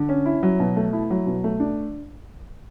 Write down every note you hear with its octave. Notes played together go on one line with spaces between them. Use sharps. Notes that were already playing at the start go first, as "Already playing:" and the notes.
Already playing: D3
C#4
E4
F#3
B2
A3
E4
F#3
B2
A3
D4